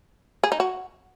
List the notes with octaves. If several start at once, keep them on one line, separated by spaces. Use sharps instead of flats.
G#4
D#4
F#4